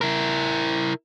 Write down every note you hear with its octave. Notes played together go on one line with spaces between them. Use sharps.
E4 A#4